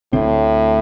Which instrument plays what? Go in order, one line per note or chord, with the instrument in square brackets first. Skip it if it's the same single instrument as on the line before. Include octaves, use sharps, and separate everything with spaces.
[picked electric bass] D2 D3 C4 [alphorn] A2